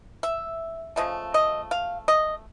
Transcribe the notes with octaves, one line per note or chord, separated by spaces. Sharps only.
E5
C#3 F3 A3 D#5
D#5
F5
D#5